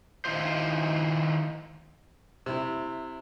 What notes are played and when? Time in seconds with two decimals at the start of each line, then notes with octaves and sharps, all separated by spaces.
0.25 D#3 E4 F4 C5
2.46 C3 E4